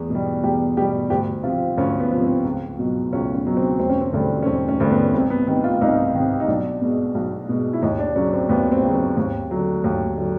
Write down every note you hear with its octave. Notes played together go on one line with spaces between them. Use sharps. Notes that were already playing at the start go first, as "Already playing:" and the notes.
Already playing: E2 G#4
B2 G3
E2 G4
B2 G3 G4
D2 G4
C3 F3 F4
D2 C#4
B3
F3
C3
C4
C#2
B2 F#3
C#2 C#4
C#4
B2 F#3
C4
E1 C4
C#4
C4
D2 D3 G3
C#4
E1 C4
C#4
D2 D3 G3
B3
C2 C4
B3
C3 D#3 B3
F4
C2 D#4
C3 D#3
D#4
B1 D4
B2 G#3
B1
B2 G#3
E4
D#2 D#4
D4
C#3 F#3 C#4
C4
D#2 B3
C4
C#3 F#3
C4
D#2
D3 F#3
D#2
D3 F#3